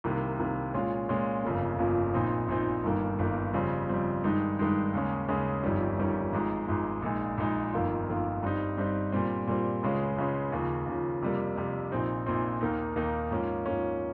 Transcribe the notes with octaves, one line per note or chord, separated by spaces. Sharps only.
C2 C3 D#3 A#3
C2 C3 D#3 A#3
A#2 G#3 C#4 F4
A#2 G#3 C#4 F4
G1 F2 C#3 F3 A#3
G1 F2 C#3 F3 A#3
A#1 A#2 F3 C4 D#4
A#1 A#2 F3 C4 D#4
G1 G2 D#3 A#3
G1 G2 D#3 A#3
F2 C#3 G3 C4
F2 C#3 G3 C4
G2 D#3 G#3 D#4
G2 D#3 G#3 D#4
D#2 C#3 G#3 C#4
D#2 C#3 G#3 C#4
G1 F2 D#3 G3 C#4
G1 F2 D#3 G3 C#4
G#1 G#2 F3 G#3
G#1 G#2 F3 G#3
A#1 A#2 G#3 D#4
A#1 A#2 G#3 D#4
G1 F2 D#3 A#3 F4
G1 F2 D#3 A#3 F4
G2 G3 C4 D#4
G2 G3 C4 D#4
A#2 G3 C4
A#2 G3 C4
C#2 C#3 G#3 C#4
C#2 C#3 G#3 C#4
D#2 C#3 F3
D#2 C#3 F3
F2 C3 G3 A#3
F2 C3 G3 A#3
A#1 A#2 F3 C4 D#4
A#1 A#2 F3 C4 D#4
D#2 D#3 A#3 D#4
D#2 D#3 A#3 D#4
G#2 F3 A#3 C#4
G#2 F3 A#3 C#4